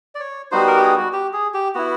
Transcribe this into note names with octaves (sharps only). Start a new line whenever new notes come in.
D5
C#5
G3 B3 D#4 F#4 C5
A#4
G4
G#4
F#4
G4
G#4
G4
B3 E4 F#4